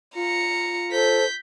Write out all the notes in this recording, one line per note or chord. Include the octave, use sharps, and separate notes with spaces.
F4 A#5 C#7
A4 C5 G6 B6